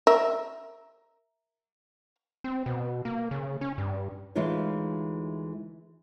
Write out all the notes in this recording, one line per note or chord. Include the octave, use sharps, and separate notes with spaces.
A#4 E5
C4
B2
A#3
C#3
C#4
G2
D2 E3 G#3 D#4 F4 C#5